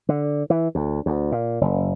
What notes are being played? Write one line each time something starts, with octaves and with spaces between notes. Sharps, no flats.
D3
E3
D2
D2
A#2
F#1